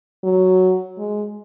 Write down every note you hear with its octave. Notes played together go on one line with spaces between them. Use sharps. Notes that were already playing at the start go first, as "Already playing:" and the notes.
F#3
G#3